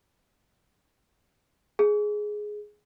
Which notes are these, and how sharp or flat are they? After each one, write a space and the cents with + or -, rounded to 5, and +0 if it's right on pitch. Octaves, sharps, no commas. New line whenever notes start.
G#4 +10